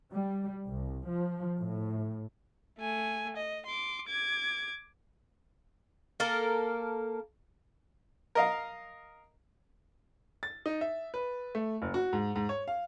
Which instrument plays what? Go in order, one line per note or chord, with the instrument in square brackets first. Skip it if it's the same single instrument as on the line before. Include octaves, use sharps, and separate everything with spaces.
[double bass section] G3
C2
F3
A2
[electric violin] A3 G#5
D#5
C6 D6
D6 G#6
[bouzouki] A#3 A4 A#4
[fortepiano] A#4 D#5 F5
[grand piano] A6
D#4
E5
B4
A3
F#1
F#4
G#2
G#2
C#5
F5